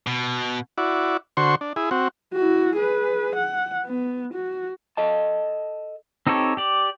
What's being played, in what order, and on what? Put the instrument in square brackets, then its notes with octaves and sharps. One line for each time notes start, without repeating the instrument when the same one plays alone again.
[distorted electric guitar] B2
[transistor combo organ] E4 F#4 D5
D3 F#4 C5 C6 C#6
D4
E4 G#4
C4 F#4
[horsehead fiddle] E4 F#4
G#4 B4
F#5
B3
F#4
[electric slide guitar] A4 D#5 A5
[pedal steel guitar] C4 D#4 G4 A4 C#5
G4 D5